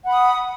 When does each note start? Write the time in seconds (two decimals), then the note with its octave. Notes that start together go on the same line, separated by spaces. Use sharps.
0.04 F#5
0.08 B5
0.12 D#6